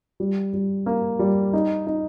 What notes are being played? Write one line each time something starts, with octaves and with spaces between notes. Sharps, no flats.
G3
G3
A#3
G3
D#4
D#4